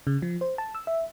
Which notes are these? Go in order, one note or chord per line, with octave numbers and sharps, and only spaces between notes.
C#3
F3
C5
A5
E6
E5